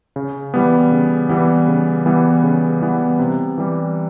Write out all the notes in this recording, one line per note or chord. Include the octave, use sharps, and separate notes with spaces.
C#3
E3 G3 B3
C#3
E3 G3 B3
C#3
E3 G3 B3
C#3
E3 G3 B3
C3
E3 G3